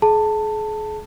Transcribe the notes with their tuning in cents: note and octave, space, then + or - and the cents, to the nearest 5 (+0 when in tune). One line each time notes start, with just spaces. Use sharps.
G#4 +40 A5 +15